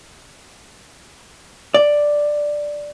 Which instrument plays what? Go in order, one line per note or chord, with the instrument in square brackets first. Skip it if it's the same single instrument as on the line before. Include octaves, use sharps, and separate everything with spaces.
[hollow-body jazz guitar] D5